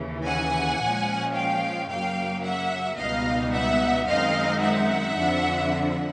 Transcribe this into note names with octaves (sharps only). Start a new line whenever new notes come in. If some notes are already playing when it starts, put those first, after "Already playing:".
Already playing: D#2 C#3 E3
F#5 G#5
A#2 F3 G#3 C#4
F5 G5
F#2 C#3 F#3 A#3 F5 G5
E5 F#5
C#2 B2 G3 B3 D#4 D#5 F5
E5 F#5
F#2 D#3 G#3 C4 D#4 D#5 F5
E5 F#5
F2 D3 F3